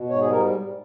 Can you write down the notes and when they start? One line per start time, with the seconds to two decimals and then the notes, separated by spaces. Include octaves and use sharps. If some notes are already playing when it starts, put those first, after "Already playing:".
Already playing: B2
0.09 G#2 C#5
0.21 G#4
0.27 G3 A#4